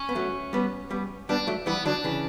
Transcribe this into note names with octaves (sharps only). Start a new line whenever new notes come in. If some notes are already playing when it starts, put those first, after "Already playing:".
Already playing: C#4
B3
F#3 A3
G3 B3
G3 B3
G3 B3 D4
F#3 A3
E3 G3 B3
D3 F#3 D4
C#3 E3